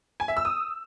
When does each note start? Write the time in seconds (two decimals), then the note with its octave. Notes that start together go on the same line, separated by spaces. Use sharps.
0.20 G#5
0.28 E5
0.37 E6
0.45 D#6